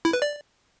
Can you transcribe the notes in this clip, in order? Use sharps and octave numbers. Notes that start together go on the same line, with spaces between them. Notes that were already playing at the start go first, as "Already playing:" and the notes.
E4
B4
D5